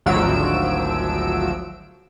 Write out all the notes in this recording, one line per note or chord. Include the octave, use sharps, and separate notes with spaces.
G#1 D2 F3 F#3 E6 D7